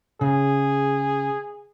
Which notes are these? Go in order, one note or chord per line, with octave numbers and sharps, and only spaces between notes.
C#3 G#4